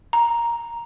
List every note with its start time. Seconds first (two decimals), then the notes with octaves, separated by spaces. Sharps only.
0.13 A#5